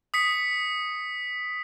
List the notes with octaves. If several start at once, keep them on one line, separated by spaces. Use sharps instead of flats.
D#6 B6 C#7